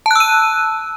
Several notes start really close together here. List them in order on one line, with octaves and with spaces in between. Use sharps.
A5 F#6 E6 D#7